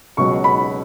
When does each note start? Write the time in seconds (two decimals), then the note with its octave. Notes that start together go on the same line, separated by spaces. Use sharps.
0.17 C#2 B2 F#3 C#6
0.44 B5